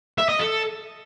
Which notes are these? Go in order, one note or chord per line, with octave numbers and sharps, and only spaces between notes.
E5
D#5
A4